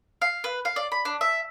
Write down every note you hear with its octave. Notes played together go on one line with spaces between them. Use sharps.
F5
B4
F5
D5
B5
D4
E5